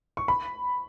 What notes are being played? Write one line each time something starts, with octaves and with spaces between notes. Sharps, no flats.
C#6
B5